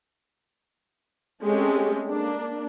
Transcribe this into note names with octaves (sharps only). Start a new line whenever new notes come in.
G#3 A3 C4 C#4 G4 A4
A#3 D4